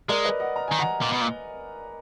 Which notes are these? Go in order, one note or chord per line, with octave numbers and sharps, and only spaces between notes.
G#3 A#4 D5
B4 D#5
D#5 F#5
A#5
D#3 G#5
F#5 A#5
A#2
B2
A#2